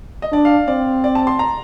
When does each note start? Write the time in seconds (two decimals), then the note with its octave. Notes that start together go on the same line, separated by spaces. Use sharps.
0.22 D#5
0.33 D4 D5
0.45 F5
0.68 C4 D5
1.04 D5
1.15 A5
1.27 C6
1.39 A#5